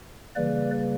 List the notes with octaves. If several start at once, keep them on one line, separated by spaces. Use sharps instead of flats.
C#3 E3 G3 A#3 B4 D5